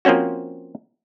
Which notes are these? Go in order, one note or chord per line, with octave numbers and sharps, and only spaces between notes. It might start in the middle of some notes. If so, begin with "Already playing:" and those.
F3 A#3 C4 C#4 F#4